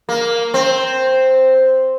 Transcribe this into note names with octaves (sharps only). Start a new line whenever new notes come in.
A#3
C4